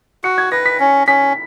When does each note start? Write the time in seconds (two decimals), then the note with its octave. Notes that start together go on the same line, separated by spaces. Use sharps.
0.24 F#4 C#7
0.38 G#6
0.52 B4 A#6
0.66 B6
0.80 C#4
1.07 C#4 B6